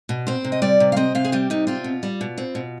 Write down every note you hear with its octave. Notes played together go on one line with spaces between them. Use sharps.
B2
C4 C5
C3
D#5
G3 D5
C3
F5
C4 D#5
C3 F5
G#4
G3 G4
C3 D#4
C4 F4
B2
G3
B2
C4
B2